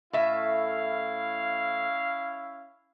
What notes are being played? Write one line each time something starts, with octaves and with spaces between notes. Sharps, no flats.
A2 C#4 E4 E5 F5